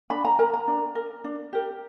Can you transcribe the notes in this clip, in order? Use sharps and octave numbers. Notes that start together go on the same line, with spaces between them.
D4 B5
A#5
A#4 A#5
A#5
D4
A#4
D4
G4 A#4